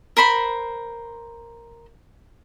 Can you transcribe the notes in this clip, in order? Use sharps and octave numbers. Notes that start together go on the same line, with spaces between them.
A#4 C5 B5 C6